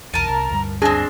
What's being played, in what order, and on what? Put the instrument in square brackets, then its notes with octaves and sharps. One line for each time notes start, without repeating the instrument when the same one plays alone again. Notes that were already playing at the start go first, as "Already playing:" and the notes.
[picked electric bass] B1 E2 [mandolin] A#4 A5 [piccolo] D#7
[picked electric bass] C2 [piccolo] A#5
[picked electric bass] D2 G2 G3
[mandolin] C4 D4 [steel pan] G#4 [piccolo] A#6